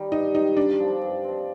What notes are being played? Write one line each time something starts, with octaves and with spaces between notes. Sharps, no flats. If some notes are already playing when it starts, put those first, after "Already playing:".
Already playing: D#3 G3
G2 D#4
D#3 G3 D#4
G2 D4
F3 C4
G2
F3 C4